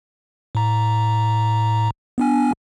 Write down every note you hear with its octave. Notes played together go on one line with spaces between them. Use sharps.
A2 A#5
B3 D4 G#5